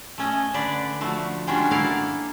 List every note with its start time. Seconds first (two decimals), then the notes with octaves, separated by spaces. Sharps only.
0.18 A3 C#4 D#5
0.54 D3 D4 B4 D5
1.01 F3 A3 F#4
1.47 G3 G#3 C#4 D4 F4 F#4
1.71 A#3 E4 A4 A#4 D5 F5